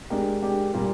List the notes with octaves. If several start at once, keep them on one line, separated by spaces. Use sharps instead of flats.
G#3 D4 G4 A#4
G#3 D4 G4 A#4
A#2 G3 A#3 F4